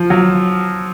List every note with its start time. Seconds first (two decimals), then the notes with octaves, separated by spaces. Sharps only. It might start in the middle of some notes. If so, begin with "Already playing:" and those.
Already playing: F3
0.10 F#3